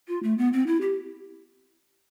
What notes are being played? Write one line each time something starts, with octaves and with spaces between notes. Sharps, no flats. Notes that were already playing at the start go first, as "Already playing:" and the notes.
F4
A3
B3
C4
E4
G4